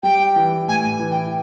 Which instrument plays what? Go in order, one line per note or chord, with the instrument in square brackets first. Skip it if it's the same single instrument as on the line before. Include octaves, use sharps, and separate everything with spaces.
[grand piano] G3 [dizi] G5
[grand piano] E3
[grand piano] A2 [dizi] G#5
[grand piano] E3
[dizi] G5